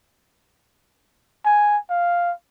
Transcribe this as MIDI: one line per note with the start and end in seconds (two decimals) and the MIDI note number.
1.45 1.77 80
1.90 2.32 77